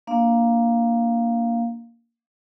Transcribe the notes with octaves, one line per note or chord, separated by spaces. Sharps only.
A#3 D4 F5